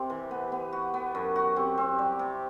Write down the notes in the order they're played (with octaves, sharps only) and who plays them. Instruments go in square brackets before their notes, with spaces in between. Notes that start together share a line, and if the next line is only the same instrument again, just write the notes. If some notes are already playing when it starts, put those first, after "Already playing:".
Already playing: [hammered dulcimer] C3 C4 [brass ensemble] G4
[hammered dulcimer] E3
B3
B3
F#4
B3
F#2
F#4
[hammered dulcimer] C4 [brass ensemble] G4
[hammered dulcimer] C4
G3
C3